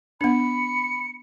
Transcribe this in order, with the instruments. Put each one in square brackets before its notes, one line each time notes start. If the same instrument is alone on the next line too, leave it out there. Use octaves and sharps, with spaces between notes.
[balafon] B3 D4 [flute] B5 [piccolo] C#7